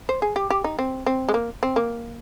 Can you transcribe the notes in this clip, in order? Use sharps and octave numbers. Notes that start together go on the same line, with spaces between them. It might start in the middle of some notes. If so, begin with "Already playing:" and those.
C5
G#4
G4
G4
D#4
C4
C4
G#3
A#3
C4
A#3